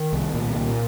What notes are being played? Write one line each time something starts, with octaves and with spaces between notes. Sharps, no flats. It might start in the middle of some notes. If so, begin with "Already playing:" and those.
Already playing: D#3
C2
A#2
A#2